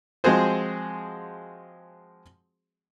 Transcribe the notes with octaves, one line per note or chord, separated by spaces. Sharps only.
F3 G#3 C4 F#4 G#4 C5